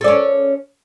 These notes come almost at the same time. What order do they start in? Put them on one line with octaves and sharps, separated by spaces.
A4 D5 C#4